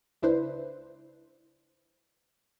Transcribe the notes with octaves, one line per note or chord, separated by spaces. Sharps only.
C#2 D4 E4 B4 C5